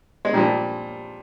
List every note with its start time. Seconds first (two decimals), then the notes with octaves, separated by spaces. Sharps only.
0.25 G#3
0.33 A#2 F3 G3